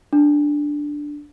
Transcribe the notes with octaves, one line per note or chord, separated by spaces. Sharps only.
D4